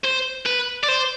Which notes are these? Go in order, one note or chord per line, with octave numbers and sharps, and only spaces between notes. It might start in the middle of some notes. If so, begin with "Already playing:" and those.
C5
B4
D5
C5